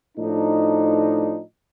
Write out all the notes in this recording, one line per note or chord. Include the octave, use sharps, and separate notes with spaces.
A2 F3 D4 D#4